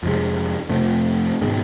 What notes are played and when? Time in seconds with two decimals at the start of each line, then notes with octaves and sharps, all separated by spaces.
0.03 F2 C3 G#3
0.69 F2 C3 A3
1.41 G#2 B2 D#3 G#3